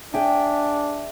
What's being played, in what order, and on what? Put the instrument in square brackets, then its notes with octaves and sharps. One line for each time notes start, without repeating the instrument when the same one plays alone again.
[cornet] D4 [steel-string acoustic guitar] G#4 E5 G5